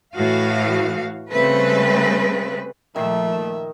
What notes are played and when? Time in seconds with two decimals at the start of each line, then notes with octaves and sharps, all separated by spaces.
0.14 A2 E3 F#4 F5
1.31 C#3 G3 A3 C4 B4
2.96 A#2 D#3 F3 A3 E5